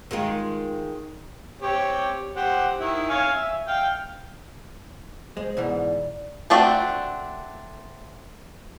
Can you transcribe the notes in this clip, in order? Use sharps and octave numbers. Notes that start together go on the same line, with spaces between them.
D#3 G#3 F4
C4 G4 C#5
G4 C5 F#5
D#3 E4
C#5 F5 G#5
E5
F5 G5
G#3 C5
G#2 B2 E3 D5
A3 C4 D4 F#4